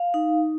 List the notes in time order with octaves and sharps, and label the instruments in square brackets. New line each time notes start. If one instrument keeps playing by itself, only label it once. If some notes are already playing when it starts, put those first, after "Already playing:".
Already playing: [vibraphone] F5
D#4